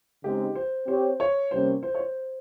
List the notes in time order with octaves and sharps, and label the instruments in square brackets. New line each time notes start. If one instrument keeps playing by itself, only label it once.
[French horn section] C#3 G#3 C4 D#4 [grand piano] G4
[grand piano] C5
[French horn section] C4 G4 C#5 [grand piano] C5
[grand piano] C#5
[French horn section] C3 G3 A#3 C#4 [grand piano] C5
[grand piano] C5
C#5
C5